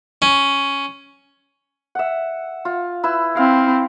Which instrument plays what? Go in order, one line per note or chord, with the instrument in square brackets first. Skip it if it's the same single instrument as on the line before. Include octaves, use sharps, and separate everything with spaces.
[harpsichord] C#4
[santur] E5 F#5
F4
E4 B4 E6
[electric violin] C4 E4 [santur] F5